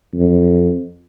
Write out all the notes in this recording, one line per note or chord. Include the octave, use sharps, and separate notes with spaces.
F2